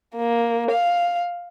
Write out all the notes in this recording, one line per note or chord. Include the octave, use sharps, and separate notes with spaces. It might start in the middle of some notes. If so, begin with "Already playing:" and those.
A#3
F5